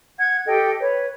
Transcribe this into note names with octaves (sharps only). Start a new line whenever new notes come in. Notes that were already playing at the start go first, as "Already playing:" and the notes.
F#5 G#6
G4 A4 D#5 G5
B4 C#5